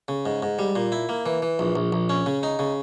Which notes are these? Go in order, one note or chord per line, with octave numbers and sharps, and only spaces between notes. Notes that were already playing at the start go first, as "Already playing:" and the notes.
C#3
G#2
G#2
G3
A#2
E4
A#3
E3
E3
A#1
A#1
A#1
C#4
C#3
D#4
C#3